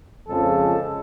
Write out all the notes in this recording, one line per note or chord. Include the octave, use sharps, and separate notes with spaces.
F2 C#3 F3 G#3 A4